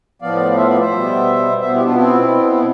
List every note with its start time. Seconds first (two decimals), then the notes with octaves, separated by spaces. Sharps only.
0.22 A2 F3 B3 D5 F5
0.52 F5
0.57 C5 E5
0.68 D5 F5
0.80 C5 E5
0.91 B2 G3 B3
1.61 B2 B3 C5 E5
1.72 E4 G4
1.84 D4 F4
1.96 C4 E4
2.31 B2 B3
2.58 E4